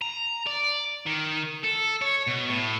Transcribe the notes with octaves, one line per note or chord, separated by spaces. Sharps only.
A#5
D5
D#3
A4
C#5
B2
A2